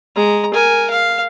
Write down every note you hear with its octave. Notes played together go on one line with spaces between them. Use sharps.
G#3 A#5
A#4 G#5
F5